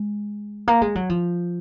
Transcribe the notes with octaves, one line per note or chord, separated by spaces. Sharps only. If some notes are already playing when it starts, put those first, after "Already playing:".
Already playing: G#3
A#3
G#3
F#3
F3